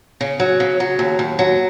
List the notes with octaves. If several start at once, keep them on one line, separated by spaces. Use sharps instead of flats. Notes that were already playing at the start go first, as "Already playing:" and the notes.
C#3
F#3
C#3
F#3
D#2
D#2
F#3